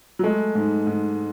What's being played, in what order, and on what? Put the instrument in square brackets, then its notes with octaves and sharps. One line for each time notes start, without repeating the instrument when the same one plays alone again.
[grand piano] F#3
[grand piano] G#3 [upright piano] A3
[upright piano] G#2
G#2